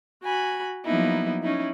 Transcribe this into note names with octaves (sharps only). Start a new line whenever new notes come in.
F#4 G#5 B5
F3 F#3 A#3 B3 D#4 E4
C#4 D#4 E4